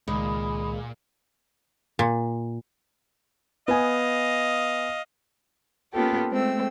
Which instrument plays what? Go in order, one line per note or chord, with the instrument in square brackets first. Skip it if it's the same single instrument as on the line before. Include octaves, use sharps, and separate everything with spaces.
[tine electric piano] C#2 D#3 [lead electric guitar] A#2 [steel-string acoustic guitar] G#3 [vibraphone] B5 D#6
[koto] A#2
[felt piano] B3 G#5 [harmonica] D#5 F5
[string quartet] A#3 B3 C#4 F4 G4 A4
G#3 A3 C4 E6